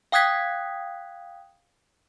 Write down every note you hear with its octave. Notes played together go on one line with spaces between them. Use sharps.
F5 G5 D#6 F#6 G#6 B6